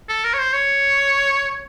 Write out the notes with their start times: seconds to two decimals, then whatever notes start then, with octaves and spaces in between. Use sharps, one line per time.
0.09 A4
0.24 A#4
0.34 C#5
0.39 C5
0.53 C#5